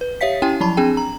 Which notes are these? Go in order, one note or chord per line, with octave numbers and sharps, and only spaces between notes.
B4
G4 C#5 E5 F5 B6
C#4 E4 G4 G5 G#5
F3 F#3 E4 A5 B5
C4 D4 G#4 G5
A#5